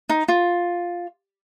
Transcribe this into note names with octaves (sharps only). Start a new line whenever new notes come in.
D#4
F4